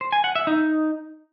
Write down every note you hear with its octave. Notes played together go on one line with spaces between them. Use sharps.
C5
G#5
F#5
E5
D#4